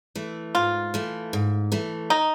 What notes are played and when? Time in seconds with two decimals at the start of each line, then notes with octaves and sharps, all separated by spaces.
0.15 E3 A3
0.55 G#2 F4
0.94 E3 A3
1.33 G#2
1.72 E3 A3
2.10 D#4